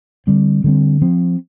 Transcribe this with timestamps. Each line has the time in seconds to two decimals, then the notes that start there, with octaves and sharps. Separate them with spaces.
0.27 D3 G3 C4
0.64 D3 G3 C4
1.02 F3 C4